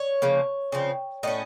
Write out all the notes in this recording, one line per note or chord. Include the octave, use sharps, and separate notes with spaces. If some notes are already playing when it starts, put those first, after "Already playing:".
Already playing: C#5
C#3 F3 A#3
C#3 F3 C4
A2 A3 C#4 D#5